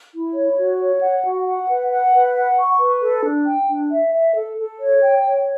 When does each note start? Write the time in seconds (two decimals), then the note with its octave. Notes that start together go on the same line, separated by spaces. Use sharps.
0.13 E4
0.34 C#5
0.58 F#4
0.80 C#5
1.02 F#5
1.24 F#4
1.46 F#5
1.69 B4
1.91 F#5
2.13 B4
2.35 F#5
2.58 C#6
2.80 B4
3.02 A4
3.24 D4
3.47 G5
3.69 D4
3.92 E5
4.14 E5
4.36 A4
4.59 A4
4.80 C#5
5.02 G5
5.25 C#5